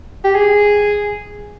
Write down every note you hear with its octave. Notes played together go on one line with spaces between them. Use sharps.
G4
G#4